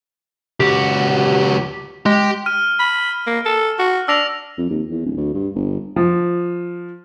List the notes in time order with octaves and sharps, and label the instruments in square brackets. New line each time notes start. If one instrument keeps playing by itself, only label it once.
[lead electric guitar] C#2 F#4 [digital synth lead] G4
[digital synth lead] G#3 [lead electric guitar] G4
[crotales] F6 D#7
[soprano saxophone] B5
A#3
A4
F#4
[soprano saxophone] D4 [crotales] E6 A#6 F7
[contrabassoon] F2
D#2
E2
D1
D2
G2
G1
[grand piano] F3